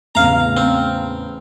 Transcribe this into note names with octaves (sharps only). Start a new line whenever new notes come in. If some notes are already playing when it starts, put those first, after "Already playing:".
E2 A2 C#3 F5 A#5
C4